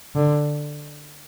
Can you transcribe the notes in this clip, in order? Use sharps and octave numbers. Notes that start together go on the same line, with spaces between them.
D3